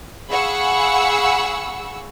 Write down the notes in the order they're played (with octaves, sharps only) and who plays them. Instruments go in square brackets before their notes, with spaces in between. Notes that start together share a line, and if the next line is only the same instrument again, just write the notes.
[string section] G#4 F5 F#5 B5 C#6 E6